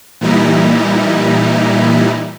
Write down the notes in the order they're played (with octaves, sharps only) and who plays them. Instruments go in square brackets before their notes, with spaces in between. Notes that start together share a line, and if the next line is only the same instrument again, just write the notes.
[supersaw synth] A#2 E3 G3 D#4 E4